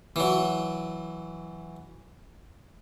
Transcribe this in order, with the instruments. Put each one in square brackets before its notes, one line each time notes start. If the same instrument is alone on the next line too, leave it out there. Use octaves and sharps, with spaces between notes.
[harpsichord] E3 F#3